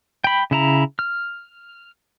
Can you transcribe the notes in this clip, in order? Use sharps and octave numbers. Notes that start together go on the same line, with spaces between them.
G5 B5
C#3 E4 A#5
F6